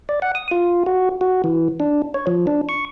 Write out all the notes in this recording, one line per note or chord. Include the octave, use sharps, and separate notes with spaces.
D5
F#5
D#6
F4
F#4
F#4
E3
D4
C#5
F3
D4
C#6